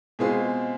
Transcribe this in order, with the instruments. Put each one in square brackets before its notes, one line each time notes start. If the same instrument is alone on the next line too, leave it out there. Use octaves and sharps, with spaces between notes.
[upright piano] B2 G#3 C4 F4 G#4